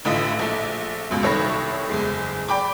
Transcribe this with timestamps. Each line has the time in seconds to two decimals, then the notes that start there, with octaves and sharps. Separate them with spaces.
0.05 A1 A2 D3 E4 F4 D#5
0.39 A#1 A3
1.10 C#2 F#2 B2
1.23 C2 D#3 A4 C#5 B5 A#6
1.89 F#1 E2 G#3
2.48 D5 G5 B5 D6